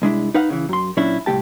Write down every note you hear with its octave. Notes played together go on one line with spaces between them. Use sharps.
C2 G#3 D4 E4
D#4 B4 F5 F#5
C#3 E3
F#2 C6
A#2 F#3 C#4 D4 E4
C2 A2 G#3 G4 A5